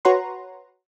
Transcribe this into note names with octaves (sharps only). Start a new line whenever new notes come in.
F#4 B4 C#5 F#5 A#5 C6